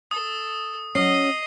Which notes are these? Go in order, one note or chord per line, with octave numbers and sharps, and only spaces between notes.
A4 D#6
F#3 C#4 D#5 C7